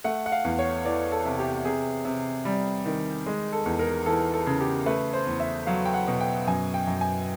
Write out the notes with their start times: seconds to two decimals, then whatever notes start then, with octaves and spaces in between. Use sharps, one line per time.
0.04 A3 F#5
0.26 F#5
0.32 F5
0.45 E2
0.59 C#5
0.85 E3 D5
1.12 A4
1.25 C3
1.39 G4
1.65 C3 G#4
2.05 C3
2.45 G3
2.86 D#3
3.26 G#3
3.53 A4
3.66 E2
3.79 A#4
4.06 E3 A4
4.34 A4
4.46 C#3
4.61 G4
4.86 A3 B4
5.13 C5
5.27 E2
5.40 E5
5.67 F#3 F5
5.85 G5
5.94 F#5
6.07 B2
6.21 G5
6.47 F#2 G#5
6.74 G5
6.87 F#2
7.01 G#5